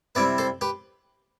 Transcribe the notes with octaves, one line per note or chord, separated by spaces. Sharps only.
C3 G3 C4 E4 B4 D5
A4 C5
G4 B4